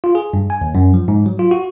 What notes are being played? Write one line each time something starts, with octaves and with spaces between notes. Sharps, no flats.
F4
G#4
G2
G#5
D#2
F#2
F3
G#2
F#3
F4
F#4